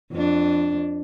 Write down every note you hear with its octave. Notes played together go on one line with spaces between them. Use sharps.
F2 D4